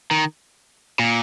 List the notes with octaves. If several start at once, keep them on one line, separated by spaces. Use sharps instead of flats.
D#3
A#2